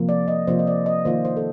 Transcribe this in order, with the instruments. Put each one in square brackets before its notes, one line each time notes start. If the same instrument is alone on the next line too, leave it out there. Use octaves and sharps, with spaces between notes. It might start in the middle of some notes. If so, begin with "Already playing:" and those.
Already playing: [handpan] C3 F3 A#3 F4
D5
D#5
C3 F3 A#3 F4 C5
D#5
D5
D#5
D#3 A#3 F4 C5
C5
A4